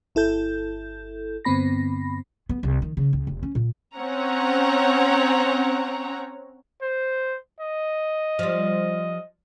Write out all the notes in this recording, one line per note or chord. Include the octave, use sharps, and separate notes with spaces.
G1 E4 A4 G6
G2 D3 B3 C4 B5 A#6
B3
C2
D#3
C#3
C#2
F1
C#4
A#2
C4 C#4 C#5 F#5 A#5
C5
D#5
F3 G3